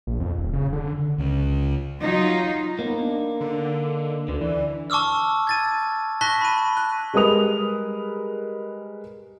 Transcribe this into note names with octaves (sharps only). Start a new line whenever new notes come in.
A#1
F2
D#1
C#3
D3
C#2
F#3 D#4 F4
A#3 B3 D#4
D4
D3
D4
D2 D3 B4
E3 D5
A5 C#6 D6 E6 F6
G#6 A6 D#7
A5 C#6 F#6 A#6 B6 G7
B5 D#7
F#6
G3 G#3 A#4 B4 D#6 F7